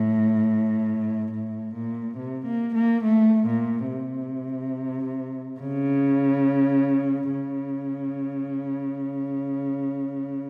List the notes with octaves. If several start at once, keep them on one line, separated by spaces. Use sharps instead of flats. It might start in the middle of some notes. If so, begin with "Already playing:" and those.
Already playing: A2
A2
A#2
C3
A#3
A#3
A3
A#2
C3
C#3
C#3